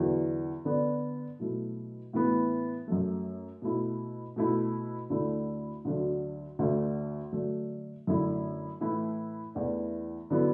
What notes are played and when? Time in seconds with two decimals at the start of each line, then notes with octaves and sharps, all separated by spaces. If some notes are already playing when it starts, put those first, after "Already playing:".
Already playing: E2 D3 F#3
0.65 D3 B3 D4
1.39 B2 F#3 A3 E4
2.13 A2 E3 B3
2.88 F#2 F#3 A3
3.62 B2 A3 E4
4.36 B2 A3 E4
5.10 D2 D3 A3 E4
5.85 D2 D3 F#3
6.59 D2 D3 A3
7.32 D3 F#3 A3 D4
8.07 F#2 D3 A3 E4
8.81 A2 E3 A3 E4
9.55 E2 E3 A3 D4
10.30 D3 F#3 B3 E4